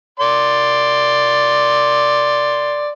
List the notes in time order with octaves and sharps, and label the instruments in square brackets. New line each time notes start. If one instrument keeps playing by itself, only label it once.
[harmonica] D5 C6